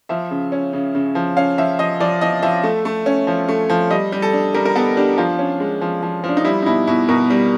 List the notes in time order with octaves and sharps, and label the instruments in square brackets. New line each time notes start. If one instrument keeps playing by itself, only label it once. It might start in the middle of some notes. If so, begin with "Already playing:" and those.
[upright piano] F3 E5
C#3
C#4
C#3
C#3
F3
C#4 F5
F3 E5
F3 D#5
F3 D5
F3 D#5
F3 E5
A3
A3
C#4
F3
A3
F3
G3 D#5
G3
A4
D4
G3 A#4
A#4
B3 A4
D4 G4
F3 F4
C#4
G#3
F3
F3
F3
D4
D#4
G3 E4
D#4
B2 E4
B2 E4
B2 A#4
G3